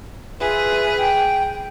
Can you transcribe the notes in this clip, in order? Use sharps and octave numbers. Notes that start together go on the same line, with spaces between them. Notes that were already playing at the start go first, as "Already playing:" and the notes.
F4 G#4 B4 E5
G5